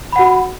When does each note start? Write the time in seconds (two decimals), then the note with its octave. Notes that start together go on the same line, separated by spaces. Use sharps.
0.12 B5
0.16 F#5
0.19 F#4